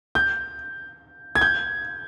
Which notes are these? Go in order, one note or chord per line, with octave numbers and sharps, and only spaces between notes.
G6
G#6
G6